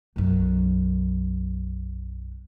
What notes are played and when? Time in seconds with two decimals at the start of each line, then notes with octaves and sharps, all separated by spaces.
0.16 B1 F#2